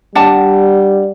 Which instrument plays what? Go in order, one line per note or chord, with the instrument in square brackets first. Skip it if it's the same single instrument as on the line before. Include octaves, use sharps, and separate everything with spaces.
[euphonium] G3 [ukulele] D4 F#5 A5